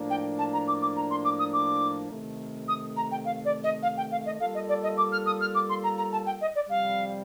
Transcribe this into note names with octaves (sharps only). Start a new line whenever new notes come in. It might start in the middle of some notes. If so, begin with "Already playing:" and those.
Already playing: A2 F3 A#3 D4
G5
A5
A#5
D6
D6
A#5
C6
D6
D#6
D6
C3 D#3 A3
D#6
A#5
G5
F5
D5
D#5
F5
G5
F5
D#5
G3 A#3 F4 A4 F5
D#5
D5
D#5
D6
F6
D#6
F6
D6
C6
A#5
A#5
A5
G5
D#5
D5
F2 C3 G3 F5